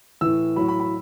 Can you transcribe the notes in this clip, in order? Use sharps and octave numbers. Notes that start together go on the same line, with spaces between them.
A2 E3 E6
A2 F#3 B5
B5
B5